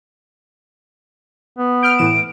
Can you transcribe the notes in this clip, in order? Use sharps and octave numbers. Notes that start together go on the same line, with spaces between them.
B3
F6 G6 D7
A2 E3 E7